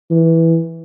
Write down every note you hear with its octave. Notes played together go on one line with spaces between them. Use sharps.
E3